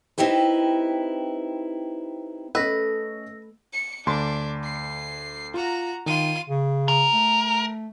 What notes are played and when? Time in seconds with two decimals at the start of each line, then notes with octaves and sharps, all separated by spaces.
0.18 C4 D#4 E4 G4 B4
2.55 A3 C#4 B4 D#5 E6 A#6
3.73 C#7
4.07 D2 D4 B5 C6
4.64 C7
5.54 F4 F#4 A#5
6.06 D#3 F4 D#7
6.50 C#3
6.88 A#4
7.14 A3